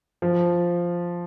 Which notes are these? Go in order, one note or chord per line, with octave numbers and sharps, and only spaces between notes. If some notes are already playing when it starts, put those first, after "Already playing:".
F3